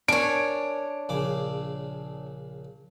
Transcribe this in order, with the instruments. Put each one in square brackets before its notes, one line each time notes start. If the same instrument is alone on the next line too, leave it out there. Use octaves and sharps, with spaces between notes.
[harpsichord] C#4 A#4 [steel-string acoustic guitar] D4 C#5 [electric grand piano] D7
[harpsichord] A#1 C#3 D6